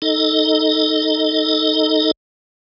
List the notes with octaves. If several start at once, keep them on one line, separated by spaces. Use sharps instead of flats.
D#4 A4 D#5